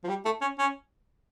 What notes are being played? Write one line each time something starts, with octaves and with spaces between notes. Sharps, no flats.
F3
G3
A3
C#4
C#4